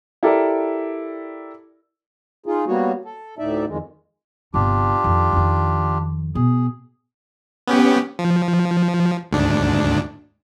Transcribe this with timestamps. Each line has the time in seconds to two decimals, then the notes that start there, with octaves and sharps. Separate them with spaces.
0.23 E4 G4 A4 A#4 D5
2.46 D#4 F4 G#4
2.67 G3 A#3 B3 F#4 C#5
3.05 A4
3.38 D2 A2 D#4 D5 E5
3.68 F2 D#3 G#3
4.54 G1 C3 D4 F4 G4
5.04 F2 D#3
5.33 F2 D#3
6.35 B2 G#4
7.67 B3 C#4 G4
8.19 F3
9.31 D2 G#2 D4